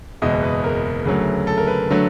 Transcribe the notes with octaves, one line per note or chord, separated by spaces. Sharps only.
F#1 E2 B2 G#3 D#5
B4
A#4
D2 C#3 F#3 A3
A4
A#4
B4
D3 F#3 A3